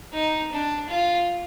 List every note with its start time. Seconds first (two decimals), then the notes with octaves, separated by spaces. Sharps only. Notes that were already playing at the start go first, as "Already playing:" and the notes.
0.14 D#4
0.52 D4
0.89 F4